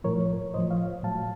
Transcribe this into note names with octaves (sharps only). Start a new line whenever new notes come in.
A2 F3 A#4 C#5
A2 F3 C5 D#5
C#5 F5
A2 F#3 F5 A5